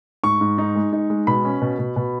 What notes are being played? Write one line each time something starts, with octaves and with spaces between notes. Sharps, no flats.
G#2 C#6
G#2
D#4
G#3
D#4
G#3
B2 B5
C#4
B2
B2
B2